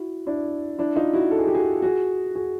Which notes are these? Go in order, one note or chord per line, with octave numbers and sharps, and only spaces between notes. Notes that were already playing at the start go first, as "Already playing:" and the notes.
Already playing: E4 F#4
D4 E4
D4 E4
D#4 F4
E4 F#4
A4
G#4
G4
F#4 G#4
F#4 G#4
F#4 G#4